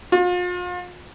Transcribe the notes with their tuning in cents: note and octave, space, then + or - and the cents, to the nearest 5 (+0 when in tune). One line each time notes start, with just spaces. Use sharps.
F4 +40